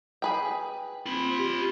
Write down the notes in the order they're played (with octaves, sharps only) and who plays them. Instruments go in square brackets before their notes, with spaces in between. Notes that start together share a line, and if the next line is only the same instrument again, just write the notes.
[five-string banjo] G#4 B4 G5
[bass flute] C4 [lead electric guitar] F4 B5
[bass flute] G4